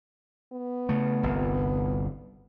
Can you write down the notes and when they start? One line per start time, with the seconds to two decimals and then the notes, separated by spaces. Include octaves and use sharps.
0.53 B3
0.89 C#3 A3
1.23 G1 C2